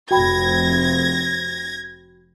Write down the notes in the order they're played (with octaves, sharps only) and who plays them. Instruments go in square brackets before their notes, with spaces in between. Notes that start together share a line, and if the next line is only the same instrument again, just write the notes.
[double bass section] F1 C4 [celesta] F#4 G5 B5 [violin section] G#6 A#6